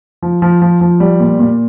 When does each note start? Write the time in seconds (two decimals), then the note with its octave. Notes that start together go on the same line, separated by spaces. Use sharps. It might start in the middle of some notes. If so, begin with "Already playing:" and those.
0.22 F3
0.42 F3
0.62 F3
0.81 F3
1.00 G3
1.20 A#2
1.39 A#2